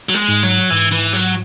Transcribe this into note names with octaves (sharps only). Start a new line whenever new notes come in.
F#3
G#3
G#2
F#3
G#2 E3
E3
F#3